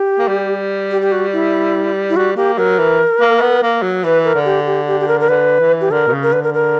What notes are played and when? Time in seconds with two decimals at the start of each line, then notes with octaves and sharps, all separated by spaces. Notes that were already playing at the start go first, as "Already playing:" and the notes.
Already playing: G4
0.19 A#3
0.28 G3
0.91 G4
1.01 G4
1.12 F#4
1.33 E4
2.10 E4
2.16 G3 F#4
2.36 A#3 G4
2.58 F#3 A#4
2.79 E3
3.21 A#3
3.41 B3
3.62 A#3
3.82 F#3
4.04 E3 B4
4.24 A#4
4.35 D3
4.45 G4
4.66 G4
4.87 G4
5.00 G4
5.08 A#4
5.20 A#4
5.29 D3 B4
5.60 E3
5.81 G4
5.91 D3 A#4
6.07 B2
6.12 C#3
6.22 A#4
6.32 D3 B4
6.43 A#4
6.54 A#4